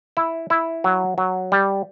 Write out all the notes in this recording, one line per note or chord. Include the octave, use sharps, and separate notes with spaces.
E4
E4
F#3
F#3
G3